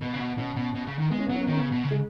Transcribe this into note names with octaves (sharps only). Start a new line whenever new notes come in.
B2 B3
C#3
B2
B2 C#4
B2
B2
C#3
D#3
G#3 B3
C#4
B3
F#3 C#4
B3
D#3 C#4
C#3 B3
B2
C#3
G#3